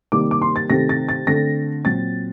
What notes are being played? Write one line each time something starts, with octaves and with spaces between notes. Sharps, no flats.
C3 D#3 G3 A#3 D6
D6
C6
A6
C3 D#3 A3 C4 A#6
A6
A6
D3 A3 C4 A#6
A#2 F#3 C4 A6